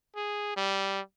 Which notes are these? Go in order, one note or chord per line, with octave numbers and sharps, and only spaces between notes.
G#4
G3